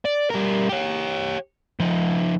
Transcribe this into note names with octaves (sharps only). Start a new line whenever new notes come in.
D5
G3 A#4
G4 C#5
F3 D#4